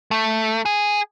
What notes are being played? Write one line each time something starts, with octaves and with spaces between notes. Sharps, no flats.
A3
G#4